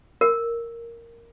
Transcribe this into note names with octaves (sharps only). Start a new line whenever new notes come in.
A#4